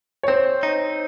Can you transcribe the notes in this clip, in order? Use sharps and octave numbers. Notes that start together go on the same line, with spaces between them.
C#5
C4 C5
D#4